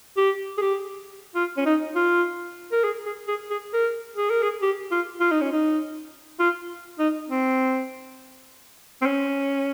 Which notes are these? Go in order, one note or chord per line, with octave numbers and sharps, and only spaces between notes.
G4
G#4
G4
F4
C#4
D#4
F4
A#4
G#4
G#4
G#4
G#4
A#4
G#4
A#4
G#4
G4
F4
F4
D#4
C#4
D#4
F4
D#4
C4
C4
C#4